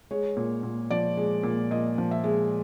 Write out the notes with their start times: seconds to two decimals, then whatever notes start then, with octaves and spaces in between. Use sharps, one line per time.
0.11 G#3 C#5
0.37 A#2
0.63 A#2
0.90 F3 D5
1.17 G#3
1.43 A#2
1.71 A#2 D#5
1.98 F3
2.11 E5
2.24 G#3